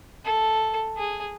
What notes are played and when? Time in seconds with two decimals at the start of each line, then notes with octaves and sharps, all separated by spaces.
0.25 A4
0.97 G#4